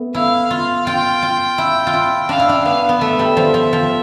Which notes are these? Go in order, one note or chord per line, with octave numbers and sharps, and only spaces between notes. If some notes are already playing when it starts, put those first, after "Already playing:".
Already playing: A3 B3
E4 F5
F4
F4 G5
F4
E4
F4
E4
D4 F5
E4
D4
B3 F5
B3
A3 E5
G3
F3
F3
F3